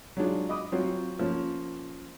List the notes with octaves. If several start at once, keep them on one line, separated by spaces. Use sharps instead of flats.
F#3 G#3 D4 F4
D#5 B5 D6 D#6
F#3 C4 F4 F#4
F3 A#3 C#4